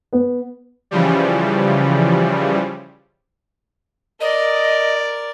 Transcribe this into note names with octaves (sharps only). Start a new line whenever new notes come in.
B3
C#3 E3 F3 G3
A#4 D5 D#5